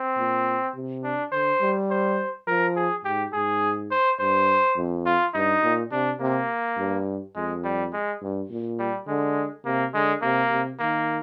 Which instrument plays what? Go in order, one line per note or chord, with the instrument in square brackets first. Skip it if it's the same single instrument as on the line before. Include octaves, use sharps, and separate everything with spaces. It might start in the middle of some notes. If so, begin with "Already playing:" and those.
Already playing: [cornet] C4
[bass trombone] A#2
C3
[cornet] D4
[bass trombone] D3 [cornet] C5
[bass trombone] G3
[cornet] C5
[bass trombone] F3 [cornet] A#4
[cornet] G#4
[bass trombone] G#2 [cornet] G4
[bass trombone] G#2 [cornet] G#4
[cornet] C5
[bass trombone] G2 [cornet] C5
[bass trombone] F2
[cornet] F4
[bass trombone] G2 [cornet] D#4
[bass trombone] A#2
[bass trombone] C3 [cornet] D4
[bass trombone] C3 [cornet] A#3
[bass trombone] G2
[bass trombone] F2 [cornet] G#3
[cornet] G3
G#3
[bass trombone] G2
A#2
[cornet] G3
[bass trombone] D3 [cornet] G#3
[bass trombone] C3 [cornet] A#3
[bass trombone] D3 [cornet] G#3
[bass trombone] C3 [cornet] A#3
[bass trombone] C3
[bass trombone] D#3 [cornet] A#3